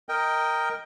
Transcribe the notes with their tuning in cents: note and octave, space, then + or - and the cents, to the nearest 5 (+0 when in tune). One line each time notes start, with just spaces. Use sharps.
A#4 -5 D#5 +5 G5 +0